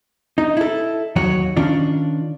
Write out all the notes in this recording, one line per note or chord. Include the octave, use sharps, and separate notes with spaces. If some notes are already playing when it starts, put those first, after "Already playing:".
D#4
E4 A4
D#2 F#3 F#4 C#5 F#5
D#3 C#4 D4 F4